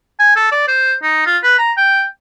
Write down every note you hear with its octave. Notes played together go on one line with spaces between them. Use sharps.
G#5
A4
D5
C5
D#4
F4
B4
A#5
G5